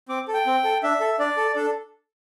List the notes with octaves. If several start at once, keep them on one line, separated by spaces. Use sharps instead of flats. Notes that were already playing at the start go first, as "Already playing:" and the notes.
C4 D6
A4
G5
C4
A4
D4 E5
A4
D4 D5
A4
D4 A4